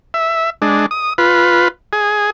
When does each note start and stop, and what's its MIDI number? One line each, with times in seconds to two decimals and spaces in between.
0.14 0.50 76
0.62 0.86 56
0.62 0.86 62
0.91 1.13 87
1.18 1.68 65
1.18 1.68 71
1.93 2.30 68